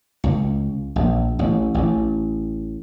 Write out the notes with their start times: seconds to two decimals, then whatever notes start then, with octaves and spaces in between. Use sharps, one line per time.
0.24 C#2
0.96 A#1
1.39 A1
1.74 A1